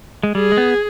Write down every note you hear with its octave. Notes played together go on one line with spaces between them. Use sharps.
G#3
G3 G#4
G#3
B3